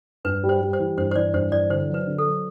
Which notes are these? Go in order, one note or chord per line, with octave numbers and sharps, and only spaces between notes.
G2 B4
G3
C5
G3
C5
E3
G2 C5
C5
E3 D5
G2 C5
E3 D5
D3 C5
F#3
B4
D3
A4
F#3